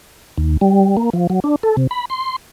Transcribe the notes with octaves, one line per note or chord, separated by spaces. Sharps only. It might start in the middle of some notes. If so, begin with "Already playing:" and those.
D#2
G3
A#3
F3
F#3
D4
A4
C3
B5
C6